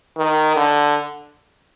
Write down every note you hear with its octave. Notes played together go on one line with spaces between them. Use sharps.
D#3
D3